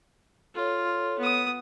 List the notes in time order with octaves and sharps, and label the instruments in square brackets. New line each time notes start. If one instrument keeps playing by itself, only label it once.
[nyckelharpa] F4 [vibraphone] A4 C#5
[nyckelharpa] B3 D#6